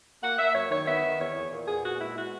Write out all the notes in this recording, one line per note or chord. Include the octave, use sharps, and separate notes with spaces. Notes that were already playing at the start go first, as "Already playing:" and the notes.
A#3 F#5
A#3 E5
F#2 C#5
D#3 C#5
B3 E5
D#3
E2 C#5
E2
A#2
B3 G#4
A#2 F#4
G#3 E4
B3 F#4